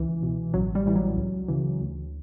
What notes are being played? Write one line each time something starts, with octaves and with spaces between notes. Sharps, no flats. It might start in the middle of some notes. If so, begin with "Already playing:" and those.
Already playing: C#2 E3
B2
A1 F#3
G3
A2 E3 G3
F#3
C#2
C#3 E3
D2